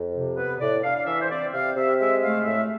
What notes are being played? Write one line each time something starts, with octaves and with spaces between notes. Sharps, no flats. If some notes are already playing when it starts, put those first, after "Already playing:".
Already playing: F2
C3
B3 B4
A2 D5
D4 F5
F5
E3 E5
C5
C4 D5
C3 F5
C3 E5
G#3 E5
A3 F5
A2 E5